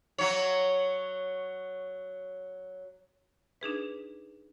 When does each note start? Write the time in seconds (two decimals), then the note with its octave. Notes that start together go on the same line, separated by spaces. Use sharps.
0.18 F#3 C#5
3.61 D4 D#4 G#4 B4